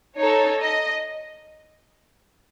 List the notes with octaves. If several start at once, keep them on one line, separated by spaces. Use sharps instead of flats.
D#4 A4 C#5
D#5